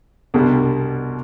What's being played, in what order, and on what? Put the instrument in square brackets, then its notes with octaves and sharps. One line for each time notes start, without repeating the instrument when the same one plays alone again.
[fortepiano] C2 B2 G3 D4